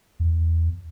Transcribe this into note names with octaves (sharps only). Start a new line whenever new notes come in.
E2